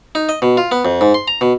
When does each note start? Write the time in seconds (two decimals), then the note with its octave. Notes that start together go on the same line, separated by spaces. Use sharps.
0.15 D#4
0.29 D#5
0.42 B2
0.57 F4
0.72 B3
0.85 F2
1.01 G#2
1.14 C6
1.28 A#5
1.41 B2